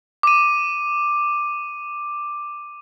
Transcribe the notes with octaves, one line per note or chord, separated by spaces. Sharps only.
D6 D#7